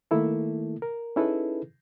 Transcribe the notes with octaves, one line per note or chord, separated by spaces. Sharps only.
D#3 A3 A#3 E4 A4
A#4
C#4 D#4 E4 G#4 A4 B4